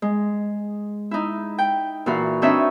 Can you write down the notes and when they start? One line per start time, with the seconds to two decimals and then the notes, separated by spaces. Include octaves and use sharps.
0.02 G#3
1.11 D#4 E4
1.59 G5
2.06 A#2 E3 F#4 F5
2.42 C4 D4 D#4 B4 C#5 E5